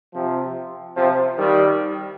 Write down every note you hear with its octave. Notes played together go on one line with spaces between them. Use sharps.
C3 F3
C3 F3
D#3 G3